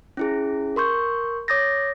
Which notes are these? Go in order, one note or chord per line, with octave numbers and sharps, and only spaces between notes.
C#4 E4 G#4
A#4 C6 C#6 G6
C#5 D6 D#6 G6 A6 A#6